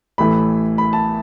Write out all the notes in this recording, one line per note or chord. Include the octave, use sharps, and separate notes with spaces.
A1 A2 E3 A3 B5
B5
A5